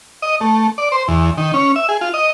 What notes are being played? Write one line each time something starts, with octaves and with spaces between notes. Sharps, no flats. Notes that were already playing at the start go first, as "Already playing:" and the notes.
D#5
A3
D5
C5
E2
D#3
C#4
E5
G#4
F4
D#5